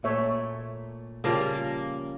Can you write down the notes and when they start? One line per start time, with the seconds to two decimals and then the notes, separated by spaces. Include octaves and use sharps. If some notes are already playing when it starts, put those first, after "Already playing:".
0.04 A#2 A3 C#5 E5
1.24 C#3 F3 G3 A#3